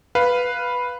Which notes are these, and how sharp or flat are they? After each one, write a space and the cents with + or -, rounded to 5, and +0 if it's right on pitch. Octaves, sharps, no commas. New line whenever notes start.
B4 +0 F5 +0